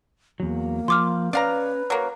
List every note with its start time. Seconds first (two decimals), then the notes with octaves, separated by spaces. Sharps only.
0.40 E2 F#3 A#3
0.88 F3 C6 D6 F6
1.33 C#4 B4 D5 F5 A#5
1.90 F#3 A#3